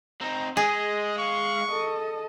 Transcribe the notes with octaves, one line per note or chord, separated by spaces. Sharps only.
C4 D#4 A#5
G#3 G#4 D#5
F5 C#6
A4 D#5